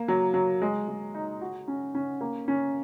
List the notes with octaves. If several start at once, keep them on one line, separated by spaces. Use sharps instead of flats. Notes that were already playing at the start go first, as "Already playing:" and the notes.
Already playing: A#3
F#3
F#3
G#3
G#3
D#4
F#4
C#4
C#4
A#3
C#4